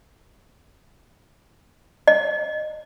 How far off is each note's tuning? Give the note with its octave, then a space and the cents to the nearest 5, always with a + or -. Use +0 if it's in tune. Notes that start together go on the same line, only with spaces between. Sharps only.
D#5 -20